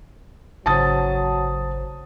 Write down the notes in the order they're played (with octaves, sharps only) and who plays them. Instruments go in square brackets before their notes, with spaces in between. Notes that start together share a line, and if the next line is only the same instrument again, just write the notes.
[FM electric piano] G#1 C#3 C5 [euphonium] F#3 [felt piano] A5 D#6 A6